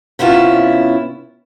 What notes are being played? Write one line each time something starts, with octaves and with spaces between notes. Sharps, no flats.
C3 B3 C#4 E4 F4